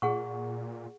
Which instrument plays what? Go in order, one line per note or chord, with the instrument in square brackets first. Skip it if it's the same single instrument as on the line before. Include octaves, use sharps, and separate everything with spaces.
[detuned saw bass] A#2 [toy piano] G#4 F#5 C#6